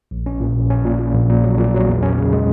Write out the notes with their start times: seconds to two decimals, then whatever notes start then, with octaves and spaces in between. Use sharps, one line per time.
0.11 A#1
0.26 C#4
0.40 A#2
0.55 A#1
0.70 C#4
0.85 A#2
1.00 A#2
1.14 A#1
1.29 A#2
1.44 F#3
1.58 A#2
1.74 F#3
1.88 E2
2.03 C#4
2.18 C#3
2.33 G#3